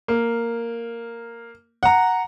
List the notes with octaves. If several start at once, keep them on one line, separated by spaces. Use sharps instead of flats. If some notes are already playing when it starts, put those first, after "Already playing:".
A#3
F#5 A#5